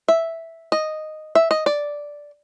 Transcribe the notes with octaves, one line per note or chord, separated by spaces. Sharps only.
E5
D#5
E5
D#5
D5